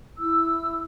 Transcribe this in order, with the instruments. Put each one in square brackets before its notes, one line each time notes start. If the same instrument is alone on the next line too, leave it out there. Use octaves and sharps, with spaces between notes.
[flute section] E4 E6